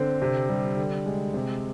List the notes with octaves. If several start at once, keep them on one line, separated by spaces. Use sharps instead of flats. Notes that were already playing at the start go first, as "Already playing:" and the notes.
Already playing: D3 C4
C3
G3
D3
G#3
C3